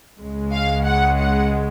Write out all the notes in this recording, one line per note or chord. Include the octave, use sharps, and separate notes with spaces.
C#2 C#3 G#3
F5
F#5
F#5